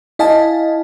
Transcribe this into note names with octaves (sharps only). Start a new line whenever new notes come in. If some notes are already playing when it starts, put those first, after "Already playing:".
E4 D#5 F5 G#5 A5